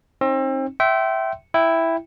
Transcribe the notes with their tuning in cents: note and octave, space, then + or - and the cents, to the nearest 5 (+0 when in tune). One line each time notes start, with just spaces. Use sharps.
C4 +35 D#4 +0
E5 +0 G5 -30 C6 +0
E4 +0 G5 +0